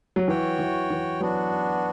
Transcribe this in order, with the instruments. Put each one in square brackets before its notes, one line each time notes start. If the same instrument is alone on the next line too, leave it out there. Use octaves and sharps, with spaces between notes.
[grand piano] F#3
[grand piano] E3 [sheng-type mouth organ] F#4 C#5 G5
[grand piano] E3
E3
[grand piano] F#3 [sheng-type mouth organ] B3 D4 F#4